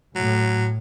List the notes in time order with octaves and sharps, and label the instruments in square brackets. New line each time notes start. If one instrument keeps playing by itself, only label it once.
[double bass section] A2 [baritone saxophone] F#3